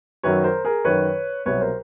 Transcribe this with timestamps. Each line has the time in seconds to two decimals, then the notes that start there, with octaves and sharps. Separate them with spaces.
0.23 F#2 D#3 F#3 B4 C#5
0.44 A#4 C5
0.65 G#4 A#4
0.85 F#2 D#3 F#3 B4 C#5
1.46 C2 B2 F#3 B4 C#5
1.61 A#4 C5